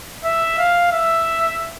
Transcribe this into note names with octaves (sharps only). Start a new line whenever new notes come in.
E5
F5
E5